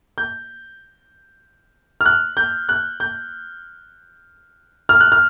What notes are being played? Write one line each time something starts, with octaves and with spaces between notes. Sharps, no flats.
G6
F6
F#6
G6
F#6
G6
F6
F#6
F6